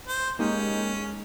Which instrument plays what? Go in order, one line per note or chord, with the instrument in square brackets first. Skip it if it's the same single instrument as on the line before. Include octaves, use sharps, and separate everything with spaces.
[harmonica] C5
[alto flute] G#3 [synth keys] A#3 D#4 G4 [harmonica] C#4